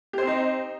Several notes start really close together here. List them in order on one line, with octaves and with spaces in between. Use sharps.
G4 C5 C4 D#4